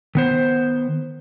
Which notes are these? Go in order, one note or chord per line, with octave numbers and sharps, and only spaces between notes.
D#3 B3 C5